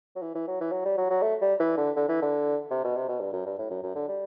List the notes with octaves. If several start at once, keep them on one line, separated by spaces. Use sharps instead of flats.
F#3
E3
E3
F#3
E3
F#3
G3
F#3
F#3
A3
G3
E3
D3
D3
E3
D3
C3
B2
C3
B2
G2
F#2
G2
A2
F#2
F#2
D3
G3